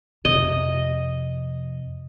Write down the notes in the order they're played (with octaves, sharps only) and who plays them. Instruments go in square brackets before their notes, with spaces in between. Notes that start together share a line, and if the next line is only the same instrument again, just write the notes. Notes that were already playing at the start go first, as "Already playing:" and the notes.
[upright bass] F2 C3 [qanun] D#5